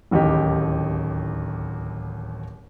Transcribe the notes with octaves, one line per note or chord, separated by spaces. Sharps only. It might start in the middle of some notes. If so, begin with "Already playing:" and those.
D1 A1 D#2 D#4 G4